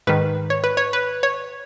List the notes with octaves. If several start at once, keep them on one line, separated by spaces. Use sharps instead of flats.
G#2 D#3 B4
C#5
B4
C#5
B4
C#5